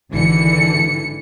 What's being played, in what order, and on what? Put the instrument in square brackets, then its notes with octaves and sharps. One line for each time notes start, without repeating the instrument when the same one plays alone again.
[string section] G#1 D3 E3 C#7